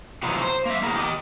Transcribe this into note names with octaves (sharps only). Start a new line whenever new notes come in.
C3 E3 F#3 B3 D#4 F4
C5
A#3 E5
B3 E4 G#4 A#4
G4 D#5